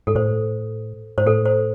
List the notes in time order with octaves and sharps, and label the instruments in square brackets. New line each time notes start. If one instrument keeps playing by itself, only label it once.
[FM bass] G#2 [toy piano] A4
[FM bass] A2 [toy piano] C5
[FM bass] G#2 [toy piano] C5
[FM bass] A2 [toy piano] A4
[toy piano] C5